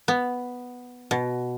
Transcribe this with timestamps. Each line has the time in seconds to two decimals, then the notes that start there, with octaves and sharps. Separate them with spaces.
0.08 B3
1.11 B2